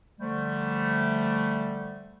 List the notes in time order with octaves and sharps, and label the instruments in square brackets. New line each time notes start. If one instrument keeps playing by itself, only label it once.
[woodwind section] D3 F3 G3 A3